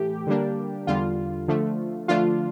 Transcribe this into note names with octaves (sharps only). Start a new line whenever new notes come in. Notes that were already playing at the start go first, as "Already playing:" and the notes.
Already playing: A2 E3 A3 G4
D3 G3 A#3 D4
E2 D3 G3 F4
D3 F3 A3
D3 F3 A3 D4 F4